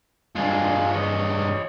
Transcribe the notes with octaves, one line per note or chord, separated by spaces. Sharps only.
G2 G#3 F4 G#4
C#5 D#5